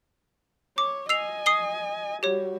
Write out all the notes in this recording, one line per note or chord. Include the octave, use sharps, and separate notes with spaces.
C#5 D6
D#5 G#5 E6 C7 F7
D#6 C7 G7
G3 F#4 G4 C#5